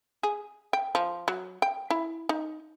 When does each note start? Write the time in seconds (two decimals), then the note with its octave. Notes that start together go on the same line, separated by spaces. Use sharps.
0.23 G#4
0.73 G5
0.95 F3
1.28 F#3
1.62 G5
1.90 E4
2.29 D#4